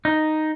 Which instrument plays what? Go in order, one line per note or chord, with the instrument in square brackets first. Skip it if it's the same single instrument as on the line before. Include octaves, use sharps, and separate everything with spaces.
[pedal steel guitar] D#4